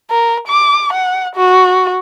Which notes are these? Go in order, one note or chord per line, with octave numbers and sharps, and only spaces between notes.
A#4
D6
F#5
F#4